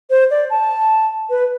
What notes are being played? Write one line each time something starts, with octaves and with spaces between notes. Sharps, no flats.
C5
D5
A5
B4